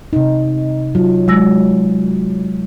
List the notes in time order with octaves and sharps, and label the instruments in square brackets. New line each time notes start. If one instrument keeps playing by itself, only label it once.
[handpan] C3 D#4
[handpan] F#3 [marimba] F4
[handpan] F#3 [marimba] G#3 E6 A#6